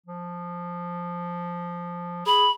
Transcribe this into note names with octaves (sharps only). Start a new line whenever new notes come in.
F3
G#4 B5